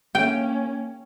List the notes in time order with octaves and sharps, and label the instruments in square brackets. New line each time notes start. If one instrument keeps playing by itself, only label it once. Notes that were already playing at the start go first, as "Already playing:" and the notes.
[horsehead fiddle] A#3 C#4 [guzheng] G5